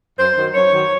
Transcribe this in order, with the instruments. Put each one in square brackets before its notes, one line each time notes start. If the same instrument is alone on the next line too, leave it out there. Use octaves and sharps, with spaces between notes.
[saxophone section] F#2 C5
D#3 F#3
F#2 C#5
D#3 F#3